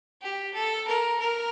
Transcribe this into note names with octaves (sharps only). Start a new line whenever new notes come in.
G4
A4
A#4
A#4